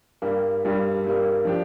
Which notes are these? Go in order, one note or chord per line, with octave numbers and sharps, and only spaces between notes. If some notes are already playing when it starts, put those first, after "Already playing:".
G2 G3 A#3
G2 G3 A#3
G2 G3 A#3
F3 D4 G4